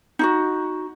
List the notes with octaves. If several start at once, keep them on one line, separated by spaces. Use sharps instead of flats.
D#4 F4 F#4